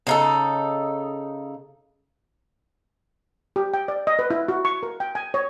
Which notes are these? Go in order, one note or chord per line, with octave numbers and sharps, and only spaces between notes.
C#3 D#4 A4
G4
G5
D5
D#5
B4
E4
F#4
C#6
A#4
G5
G#5
C#5